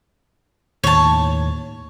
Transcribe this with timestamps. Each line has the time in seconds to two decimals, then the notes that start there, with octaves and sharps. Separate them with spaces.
0.84 D#2 A2 D#3 C#5 A5